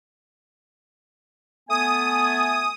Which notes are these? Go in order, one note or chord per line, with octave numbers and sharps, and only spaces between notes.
A3 B3 G#5 D#6